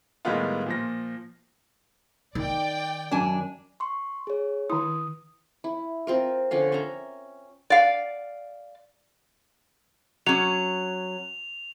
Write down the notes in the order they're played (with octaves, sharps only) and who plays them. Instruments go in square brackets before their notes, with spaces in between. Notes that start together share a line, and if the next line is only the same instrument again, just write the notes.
[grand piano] A2 D#3 G3 G#3 B3 F4
A#2 F3 A#6
[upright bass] D#3 [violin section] D5 G5
[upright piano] F#2 [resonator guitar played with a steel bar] D4 G#5
[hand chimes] C6 C#6
G#4 C#5
[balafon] D#3 E4 [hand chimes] D#6
[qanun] E4
C4 F4 A#4
D3 F3 C#4 F5
C#4 E5 A#5
[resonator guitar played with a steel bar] D5 F5
[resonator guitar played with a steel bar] F#3 C#4 [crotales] F7